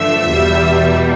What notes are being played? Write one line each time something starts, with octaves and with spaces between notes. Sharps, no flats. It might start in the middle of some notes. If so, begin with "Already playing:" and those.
Already playing: G2 D3 F3 A3 E5
E2 B2 G3